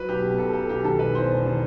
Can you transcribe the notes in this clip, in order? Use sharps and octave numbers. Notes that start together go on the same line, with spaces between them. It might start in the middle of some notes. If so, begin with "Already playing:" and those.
Already playing: F#3 B4
B1 G4
B2
B1 A4
F#3 A4
B1 G4
D#3 A4
E1 B4
E2 C5
E1
D#3